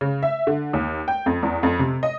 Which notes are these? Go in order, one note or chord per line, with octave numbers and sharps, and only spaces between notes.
C#3
E5
D3
D#2
G5
F2
E2
F2
C3
D#5